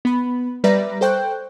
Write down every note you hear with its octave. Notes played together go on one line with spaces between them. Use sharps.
B3 B5
G3 B4 D5 E5 A#5 A#6
A4 C5 G5 C#6 F#6 G6